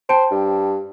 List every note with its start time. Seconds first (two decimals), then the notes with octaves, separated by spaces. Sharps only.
0.09 C5 G5 A5
0.31 G2